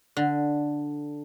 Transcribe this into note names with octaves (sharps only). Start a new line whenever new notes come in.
D3